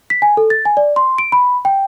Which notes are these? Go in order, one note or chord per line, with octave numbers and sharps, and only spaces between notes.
B6
G#5
A4
A6
G#5
D5
C6
D7
B5
G5